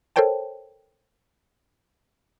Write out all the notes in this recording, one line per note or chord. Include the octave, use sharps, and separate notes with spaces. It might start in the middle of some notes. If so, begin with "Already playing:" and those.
A4 A#4 C5 C#5 G5 A5